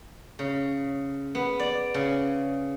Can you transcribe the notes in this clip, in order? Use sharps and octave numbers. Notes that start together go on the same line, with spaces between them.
C#3
B3
D5
C#3